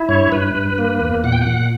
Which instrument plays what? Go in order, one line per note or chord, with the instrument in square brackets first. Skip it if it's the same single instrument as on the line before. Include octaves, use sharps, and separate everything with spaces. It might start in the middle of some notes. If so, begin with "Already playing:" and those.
Already playing: [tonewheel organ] E4
G2 C#5
G2 B4
G2
A#3
E2
A#2 F#5
G5
F#5
A#2